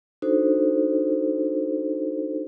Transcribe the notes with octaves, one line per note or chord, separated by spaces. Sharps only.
D4 D#4 F#4 A4 C5